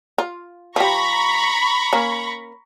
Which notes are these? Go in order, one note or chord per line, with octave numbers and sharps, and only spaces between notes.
F4
F3 G4 A#5 B5 C#6
A#3 C#4